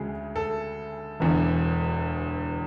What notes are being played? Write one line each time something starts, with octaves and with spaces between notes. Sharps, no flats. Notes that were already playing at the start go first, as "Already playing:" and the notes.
Already playing: D2 C#3 G#3 G#4
A4
E1 E2 D3